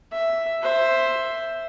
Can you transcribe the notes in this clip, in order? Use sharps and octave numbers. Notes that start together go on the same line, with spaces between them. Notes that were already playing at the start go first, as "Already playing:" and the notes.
E5
C5 E5